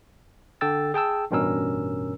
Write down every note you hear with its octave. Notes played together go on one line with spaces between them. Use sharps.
D3 A4 G5 E6 A6
G#4 G5 A5 E6
A1 G2 B2 C#4 A#4 E6